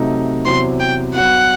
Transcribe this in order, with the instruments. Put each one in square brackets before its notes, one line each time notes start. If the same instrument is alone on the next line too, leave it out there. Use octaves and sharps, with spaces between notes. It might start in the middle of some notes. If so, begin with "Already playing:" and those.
Already playing: [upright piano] C3 F#3 A3 D#4
[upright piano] E2 C3 F#3 C4 [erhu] C6
[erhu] G5
[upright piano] G2 F#3 B3 F#4 [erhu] F#5